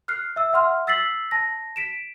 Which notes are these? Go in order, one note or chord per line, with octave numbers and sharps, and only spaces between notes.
F6 F#6 C7
E5 E6
E5 F#5 C6 F6
E6 A6 B6 C7 F#7
A5 A#6
B6 D7 E7